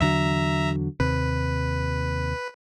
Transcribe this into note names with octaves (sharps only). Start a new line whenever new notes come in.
E2 D3 F#3 E5 A#5
D#2 C3 B4